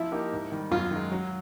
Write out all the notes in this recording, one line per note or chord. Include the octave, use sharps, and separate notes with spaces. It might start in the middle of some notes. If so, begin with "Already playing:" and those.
Already playing: F3 E4
A#3 D#4 G4 A#4
G#2
D#3 G3
F#2 F4
D#3 G#3
F#3